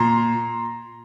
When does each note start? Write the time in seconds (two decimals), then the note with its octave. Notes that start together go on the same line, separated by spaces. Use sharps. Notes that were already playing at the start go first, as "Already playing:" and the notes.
Already playing: A#2 A#5 C6